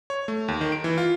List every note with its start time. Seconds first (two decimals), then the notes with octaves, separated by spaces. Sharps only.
0.10 C#5
0.28 A3
0.48 D#2
0.61 D#3
0.72 D7
0.84 E3
0.98 F4